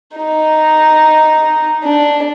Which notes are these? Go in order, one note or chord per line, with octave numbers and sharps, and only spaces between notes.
D#4
D4